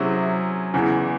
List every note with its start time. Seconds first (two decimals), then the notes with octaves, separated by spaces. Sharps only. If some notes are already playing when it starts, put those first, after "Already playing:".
Already playing: C3 F#3 C#4 E4 G#4
0.74 E2 C#3 E3